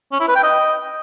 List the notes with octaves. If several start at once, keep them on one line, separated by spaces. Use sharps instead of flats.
C#4
E4
B4
G5
D#5